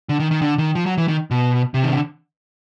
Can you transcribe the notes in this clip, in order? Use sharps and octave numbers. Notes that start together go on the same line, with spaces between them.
D3
D#3
D#3
D3
D#3
F3
F#3
E3
D#3
B2
C3
D#3
D3